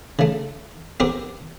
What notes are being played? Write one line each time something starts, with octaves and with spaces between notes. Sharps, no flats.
C#3 A3
B3 C4 G4 A#4